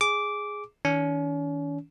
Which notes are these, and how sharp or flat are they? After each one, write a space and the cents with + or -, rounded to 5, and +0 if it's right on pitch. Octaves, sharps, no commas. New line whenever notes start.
G#4 +0 D6 -10
D#3 +35 C#4 +40